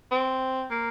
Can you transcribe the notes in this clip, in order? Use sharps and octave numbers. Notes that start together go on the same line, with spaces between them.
C4
A#3